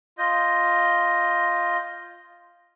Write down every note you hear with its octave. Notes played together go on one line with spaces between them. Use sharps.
F4 D#5 G6